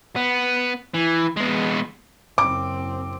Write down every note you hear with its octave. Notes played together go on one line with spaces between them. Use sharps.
B3
E3
G#3 B3
F#1 C4 D6